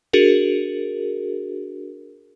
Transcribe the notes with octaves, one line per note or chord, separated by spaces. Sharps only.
D4 F#4 G#4 A#4